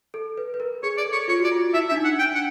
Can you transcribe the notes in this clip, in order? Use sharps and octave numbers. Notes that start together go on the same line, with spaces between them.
A4
B4
B4
A#4
G#4 C#5
D5
A4
C#5
F4 C#5
F#4 D5
F4
E4 E5
D4 E5
D#4
F#5
D4 G5
F#5